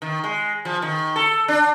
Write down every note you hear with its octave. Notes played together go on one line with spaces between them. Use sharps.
D#3
G#3
F3
D#3
A4
D4